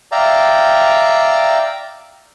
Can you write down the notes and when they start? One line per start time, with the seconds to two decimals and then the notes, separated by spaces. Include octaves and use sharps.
0.12 D5 E5 F5 G5 A#5